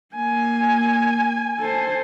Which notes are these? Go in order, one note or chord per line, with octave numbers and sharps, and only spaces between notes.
A#3 G#5
A4 C5